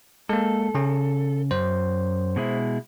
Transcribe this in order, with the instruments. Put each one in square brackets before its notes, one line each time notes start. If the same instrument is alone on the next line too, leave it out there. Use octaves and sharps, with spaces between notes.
[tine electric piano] G#3 A#3 [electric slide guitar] A4
[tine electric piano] C#3 C#4
[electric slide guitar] F#2 [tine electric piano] C5
[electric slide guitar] B2 G#3 E4